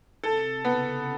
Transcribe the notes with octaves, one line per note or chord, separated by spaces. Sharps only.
C3 A4
C#3 B3